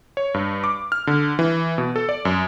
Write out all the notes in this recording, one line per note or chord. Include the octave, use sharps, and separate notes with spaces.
C#5
G2
D6
F6
D3
E3
B2
A4
D5
F#2